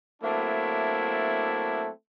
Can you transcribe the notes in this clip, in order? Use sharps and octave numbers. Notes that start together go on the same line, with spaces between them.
F#3 A3 A#3 C4 D4 E4